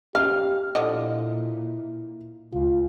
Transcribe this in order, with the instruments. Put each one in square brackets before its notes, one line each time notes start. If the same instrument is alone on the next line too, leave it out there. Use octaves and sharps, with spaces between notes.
[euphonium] G4 [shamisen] F5 [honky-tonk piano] F6
[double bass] A#2 [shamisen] D3 F3 D#5 [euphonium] E4
[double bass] C#2 [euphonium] F4